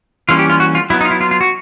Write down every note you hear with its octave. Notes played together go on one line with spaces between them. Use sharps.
E3 G3 A#3 C#4 F4
G4
F4
F#4
F4
F#3 B3 E4
D#4
F4
E4
F4
F4
F#4